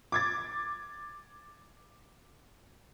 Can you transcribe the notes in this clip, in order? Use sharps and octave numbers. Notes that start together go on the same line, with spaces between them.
D6 G#6 A6